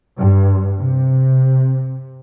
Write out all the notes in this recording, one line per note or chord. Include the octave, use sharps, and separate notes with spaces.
G2
C3